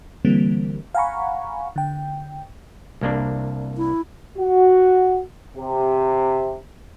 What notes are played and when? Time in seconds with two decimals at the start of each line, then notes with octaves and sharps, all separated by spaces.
0.25 D3 E3 G3 A#3 C4
0.95 F5 F#5 G#5 A#5 B5 C#6
1.76 D3 G5
3.01 C2 A#3 D4
3.77 E4
4.38 F#4
5.57 C3